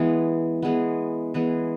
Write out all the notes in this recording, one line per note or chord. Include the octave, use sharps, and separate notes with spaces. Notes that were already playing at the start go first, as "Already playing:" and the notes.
Already playing: E3 G#3 B3
E3 G#3 B3
E3 G#3 B3